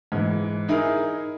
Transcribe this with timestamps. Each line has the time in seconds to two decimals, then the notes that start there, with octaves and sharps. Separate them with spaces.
0.12 G#2 E3
0.69 D#4 E4 G#4 A#4